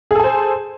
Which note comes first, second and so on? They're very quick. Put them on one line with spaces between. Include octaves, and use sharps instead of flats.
G#4 A4 G#5 C5